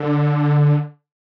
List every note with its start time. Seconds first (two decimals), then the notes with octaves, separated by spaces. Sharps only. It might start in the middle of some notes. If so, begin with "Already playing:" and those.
Already playing: D3